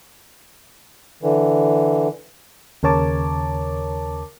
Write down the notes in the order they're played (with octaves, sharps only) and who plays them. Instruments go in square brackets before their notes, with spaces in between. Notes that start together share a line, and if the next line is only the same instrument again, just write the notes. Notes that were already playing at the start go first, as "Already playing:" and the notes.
[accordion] D3 E3
[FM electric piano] D#2 C#3 A#4 C#5 A5 D6